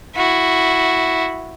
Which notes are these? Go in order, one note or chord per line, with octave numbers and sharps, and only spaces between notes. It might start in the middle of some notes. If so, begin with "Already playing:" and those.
E4 F#4